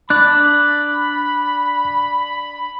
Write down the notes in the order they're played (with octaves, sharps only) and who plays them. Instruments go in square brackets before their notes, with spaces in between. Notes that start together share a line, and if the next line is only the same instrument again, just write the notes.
[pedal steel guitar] D4 D5 [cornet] B5 [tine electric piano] F#6